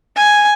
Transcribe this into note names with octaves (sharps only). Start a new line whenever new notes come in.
G#5